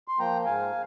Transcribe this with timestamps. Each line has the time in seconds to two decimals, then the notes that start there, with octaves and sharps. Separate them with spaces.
0.08 C6
0.19 F3 A#3 G5 A#5
0.45 G#2 F5 G#5